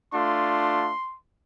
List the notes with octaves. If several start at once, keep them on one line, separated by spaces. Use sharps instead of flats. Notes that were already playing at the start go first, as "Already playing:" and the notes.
A3 D4 F4 C6